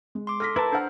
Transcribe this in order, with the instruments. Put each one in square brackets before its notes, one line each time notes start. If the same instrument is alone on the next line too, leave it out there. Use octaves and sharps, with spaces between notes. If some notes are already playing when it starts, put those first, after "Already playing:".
[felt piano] G#3
[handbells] C6 D6
[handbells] A4 [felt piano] F6 A#6 B6
[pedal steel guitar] E4 A#4 A5 [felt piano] B4
[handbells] D4 C5 F6 [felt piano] B4 F#5